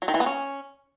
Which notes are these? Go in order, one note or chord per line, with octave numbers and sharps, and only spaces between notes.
F#3
D#3
E3
B3
C#4